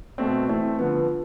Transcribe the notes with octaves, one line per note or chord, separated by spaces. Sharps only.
B2 A3 C4
E3 A3 C4
D3 F3 B3